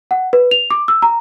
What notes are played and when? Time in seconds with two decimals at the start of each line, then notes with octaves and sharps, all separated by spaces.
0.11 F#5
0.33 B4
0.51 F7
0.71 D6
0.88 E6
1.02 A#5